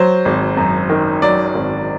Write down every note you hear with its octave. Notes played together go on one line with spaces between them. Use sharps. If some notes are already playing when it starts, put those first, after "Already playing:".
Already playing: F#3 C5
G#1
F#2
D#3
F#3 D5
G#1